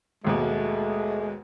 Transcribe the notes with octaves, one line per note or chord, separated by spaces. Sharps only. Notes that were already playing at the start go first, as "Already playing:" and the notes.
G#1 D#2 B2 G#3 A3